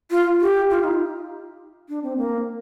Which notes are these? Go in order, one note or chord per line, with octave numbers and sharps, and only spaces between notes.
F4
G4
F4
D#4
D4
C4
A#3